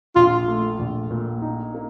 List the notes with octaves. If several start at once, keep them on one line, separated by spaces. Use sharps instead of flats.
A#1 F4
A3
A#1
A#2
D#4
A#3